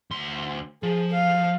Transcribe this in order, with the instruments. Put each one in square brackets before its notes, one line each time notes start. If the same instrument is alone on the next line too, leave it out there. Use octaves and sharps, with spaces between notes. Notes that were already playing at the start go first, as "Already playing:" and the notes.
[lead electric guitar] D2 C6
[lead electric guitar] F3 [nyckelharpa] G#4
[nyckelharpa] F5